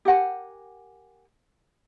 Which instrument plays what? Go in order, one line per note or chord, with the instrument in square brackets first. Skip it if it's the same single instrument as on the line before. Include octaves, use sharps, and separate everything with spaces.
[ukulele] G4 A#4 F#5 G#5